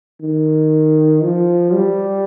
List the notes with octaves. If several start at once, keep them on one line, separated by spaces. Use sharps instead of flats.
D#3
F3
G3